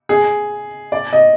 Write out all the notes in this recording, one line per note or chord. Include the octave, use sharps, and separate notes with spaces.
G#4
D5
D#5